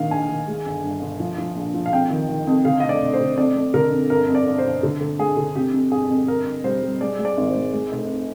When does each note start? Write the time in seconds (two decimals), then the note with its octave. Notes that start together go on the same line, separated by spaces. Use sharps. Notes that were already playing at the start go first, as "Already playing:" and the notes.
Already playing: A#1 D#3 F5
0.11 A#1 G#5
0.29 D#3
0.48 G#3
0.66 G1
0.84 G2
1.02 G1
1.20 F3
1.38 F3
1.56 A#1
1.74 F3
1.86 F5
1.93 F2 G5
2.10 D#3
2.29 D#3
2.47 F2
2.65 D3 F5
2.80 F1 D#5
2.89 D5
3.01 F1
3.13 C5
3.20 D3
3.38 F2 D5
3.56 F2
3.74 D3 A#4
3.92 F2
4.10 G1 A#4
4.29 F2
4.35 D5
4.46 G1
4.58 C5
4.65 G1
4.83 D3
5.01 D3
5.19 G#3 G#4
5.37 D3
5.56 C3 G4
5.74 F2
5.92 G1 G#4
6.10 F2
6.28 G1 A#4
6.46 G1
6.64 G3 C5
6.83 G3
7.01 G#3 D5
7.19 G#3
7.25 D5
7.37 G#1
7.49 C5
7.55 G#3
7.73 G#3
7.92 F1